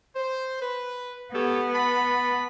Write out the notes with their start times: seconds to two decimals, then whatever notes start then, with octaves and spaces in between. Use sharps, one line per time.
0.15 C5
0.61 B4
1.34 B3 G4 A4 C#5
1.74 A5 B5